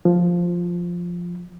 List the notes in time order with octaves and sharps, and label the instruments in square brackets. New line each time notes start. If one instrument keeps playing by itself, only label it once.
[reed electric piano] F3